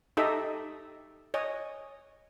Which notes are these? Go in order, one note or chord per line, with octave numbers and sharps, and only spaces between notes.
D#4 G4 A4 D#5 E5
C#5 D#5 G#5